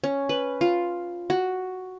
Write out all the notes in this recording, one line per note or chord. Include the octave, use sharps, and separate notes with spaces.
C#4
B4
F4
F#4